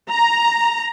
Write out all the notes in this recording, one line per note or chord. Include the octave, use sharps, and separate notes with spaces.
A#5